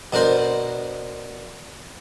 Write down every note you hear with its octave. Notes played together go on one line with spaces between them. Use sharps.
B2 D4 A#4 C5